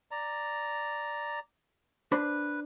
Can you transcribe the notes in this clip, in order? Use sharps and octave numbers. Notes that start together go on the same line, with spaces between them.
D5 A#5
D4 B4 C5 B5